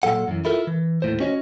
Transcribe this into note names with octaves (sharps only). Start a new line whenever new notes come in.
A#2 F#3 A4 F#5
F#2 E3
E4 F4 A4 A#4 E5
E3
D#2 A2 C5
C#4 F#4 C#5 D#5